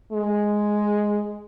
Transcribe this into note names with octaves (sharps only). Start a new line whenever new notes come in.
G#3